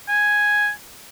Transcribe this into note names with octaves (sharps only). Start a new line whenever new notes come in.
G#5